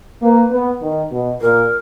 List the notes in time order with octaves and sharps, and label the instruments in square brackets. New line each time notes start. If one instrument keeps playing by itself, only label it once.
[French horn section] A#3 [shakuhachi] B4
[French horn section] B3
D#3
B2
[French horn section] A#2 [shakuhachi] A#4